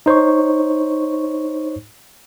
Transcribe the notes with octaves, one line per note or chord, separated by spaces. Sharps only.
D#4 C5 C#5 C#6